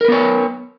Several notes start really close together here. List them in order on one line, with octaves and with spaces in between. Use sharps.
A#4 B4 B3 C#5